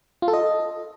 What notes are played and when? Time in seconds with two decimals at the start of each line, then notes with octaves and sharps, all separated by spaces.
0.22 F4
0.28 A4
0.33 D#5